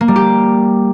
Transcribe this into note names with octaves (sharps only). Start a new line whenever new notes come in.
A#3
G3
G4